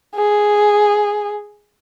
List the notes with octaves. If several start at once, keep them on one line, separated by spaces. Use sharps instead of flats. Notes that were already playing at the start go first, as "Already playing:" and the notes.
G#4